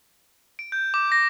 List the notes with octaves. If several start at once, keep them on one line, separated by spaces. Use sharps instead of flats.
D7
G6
D6
A#6